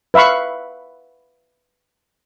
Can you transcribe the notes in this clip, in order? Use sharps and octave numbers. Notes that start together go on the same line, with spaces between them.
B4 E5 F5 B5 C#6